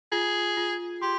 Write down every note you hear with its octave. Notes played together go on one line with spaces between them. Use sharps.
F4 G#4
F4
G4 C6